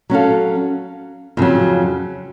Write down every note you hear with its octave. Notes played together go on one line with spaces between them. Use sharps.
F#3 C#4 F#4 A4 F5
F2 C#3 F#3